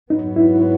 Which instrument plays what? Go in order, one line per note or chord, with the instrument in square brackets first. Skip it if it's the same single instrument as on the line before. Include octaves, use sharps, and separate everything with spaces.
[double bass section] G#2 F#3 B3 [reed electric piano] D#4
[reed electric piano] E4